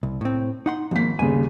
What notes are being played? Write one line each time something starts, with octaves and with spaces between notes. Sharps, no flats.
C2
A2 C4
D#4 F#5 C6
G#1 F3 A#3 B6
G1 D#2 C#3 G#5